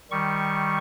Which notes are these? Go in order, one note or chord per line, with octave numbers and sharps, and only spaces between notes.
D#3 G3 C#6